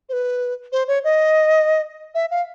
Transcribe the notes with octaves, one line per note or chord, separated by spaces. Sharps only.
C5
B4
C5
C#5
D#5
E5
F5